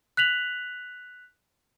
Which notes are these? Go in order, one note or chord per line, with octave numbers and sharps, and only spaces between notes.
F#6 B6 F7 F#7